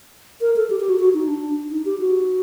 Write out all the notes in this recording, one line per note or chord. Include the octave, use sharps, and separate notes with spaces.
A#4
A4
G4
G4
F#4
F#4
D#4
D4
D#4
G4
F#4